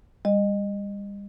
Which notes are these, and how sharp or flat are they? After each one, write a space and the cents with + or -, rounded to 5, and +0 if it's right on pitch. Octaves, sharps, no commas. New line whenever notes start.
G3 +35 D#5 -20